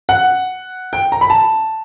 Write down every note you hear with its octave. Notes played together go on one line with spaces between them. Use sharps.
F#5
G5
A#5
B5
A5